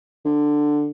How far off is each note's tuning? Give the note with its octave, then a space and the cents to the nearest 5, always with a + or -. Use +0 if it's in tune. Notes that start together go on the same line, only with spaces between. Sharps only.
D3 +10